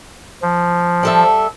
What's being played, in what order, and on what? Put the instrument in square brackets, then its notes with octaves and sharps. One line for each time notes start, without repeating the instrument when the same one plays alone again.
[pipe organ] F3
[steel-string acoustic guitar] G3 A4 E5